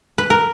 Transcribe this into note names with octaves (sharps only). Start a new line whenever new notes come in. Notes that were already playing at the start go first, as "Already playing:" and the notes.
B4
A#4